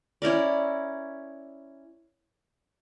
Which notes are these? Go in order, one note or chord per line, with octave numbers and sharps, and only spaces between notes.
C#4 E4 A#4 D5